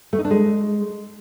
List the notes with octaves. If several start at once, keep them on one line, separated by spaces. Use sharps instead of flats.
A3
D#4
D4
G#3